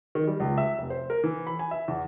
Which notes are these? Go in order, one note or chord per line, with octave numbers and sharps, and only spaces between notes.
D#3
G3
C#2
E5
F1
C5
A#4
E3
B5
G#5
E5
E2